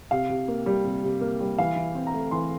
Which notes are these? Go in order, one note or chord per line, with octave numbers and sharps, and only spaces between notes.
C3 F5
C3
A#3
G3
C3
C3
A#3
G3
E3 F5
E3
C4
A#5
A3
E3 C6